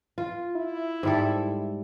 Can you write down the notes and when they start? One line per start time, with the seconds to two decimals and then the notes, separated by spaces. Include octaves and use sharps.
0.18 F4
0.56 E4
1.03 G#2 G3 A4